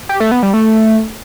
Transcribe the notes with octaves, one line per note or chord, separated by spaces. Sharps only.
G4
A3
B3
G3
A3